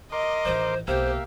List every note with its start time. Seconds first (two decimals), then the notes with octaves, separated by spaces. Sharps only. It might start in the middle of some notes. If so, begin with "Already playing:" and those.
0.12 A#4 D#5 C6 D6
0.45 A1 D#3 C5
0.88 B1 A#3 G4 C5 E5 F5